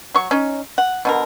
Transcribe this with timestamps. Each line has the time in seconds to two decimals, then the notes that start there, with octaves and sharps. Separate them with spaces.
0.15 F#3 C#6
0.31 C#4 D#4
0.78 F#5
1.05 B2 D3 A#4